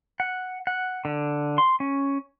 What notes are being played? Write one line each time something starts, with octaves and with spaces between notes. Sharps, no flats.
F#5
F#5
D3
C6
C#4